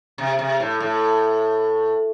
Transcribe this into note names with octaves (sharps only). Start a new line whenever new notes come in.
C3
C3
A2
A2